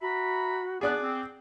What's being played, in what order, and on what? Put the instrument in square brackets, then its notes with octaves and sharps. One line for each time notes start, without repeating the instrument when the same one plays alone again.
[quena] F#4 [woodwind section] E5 A#5 B5
[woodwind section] B3 D4 [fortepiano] G#4 D5 F#6 [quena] D6
[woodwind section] C4